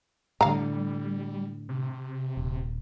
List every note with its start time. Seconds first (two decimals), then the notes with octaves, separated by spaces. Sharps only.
0.41 A2 D3 G3 F5 A#5
1.69 C3
2.37 D#1